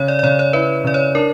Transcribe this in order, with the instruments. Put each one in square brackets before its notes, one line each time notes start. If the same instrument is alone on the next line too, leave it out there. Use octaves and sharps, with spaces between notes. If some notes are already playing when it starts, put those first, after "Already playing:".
Already playing: [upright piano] C#3 [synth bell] C#5
[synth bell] D5
D5
[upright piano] C#3 [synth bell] C#5
[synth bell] C#5
[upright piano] E4 [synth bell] B4
[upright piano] C#3 [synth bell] D5
[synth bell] C#5
[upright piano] D4 [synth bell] A#4